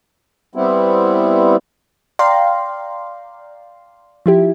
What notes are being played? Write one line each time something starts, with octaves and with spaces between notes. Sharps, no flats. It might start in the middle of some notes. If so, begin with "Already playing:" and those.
G3 B3 C4 E4
D5 F5 G5 A#5 C6
F3 E4 G4